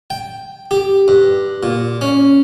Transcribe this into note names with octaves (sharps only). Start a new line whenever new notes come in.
G5
G4
G2
A#2
C#4